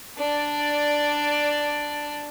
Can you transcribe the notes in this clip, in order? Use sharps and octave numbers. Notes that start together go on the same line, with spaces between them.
D4 D5